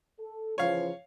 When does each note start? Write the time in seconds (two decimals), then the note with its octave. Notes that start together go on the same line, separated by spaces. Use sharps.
0.20 A4
0.58 C#3 E3 F3 C#5 F5